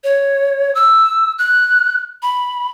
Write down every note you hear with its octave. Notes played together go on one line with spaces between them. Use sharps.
C#5
E6
F#6
B5